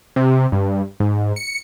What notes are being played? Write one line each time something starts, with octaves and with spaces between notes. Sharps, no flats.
C3
G2
G#2
C#7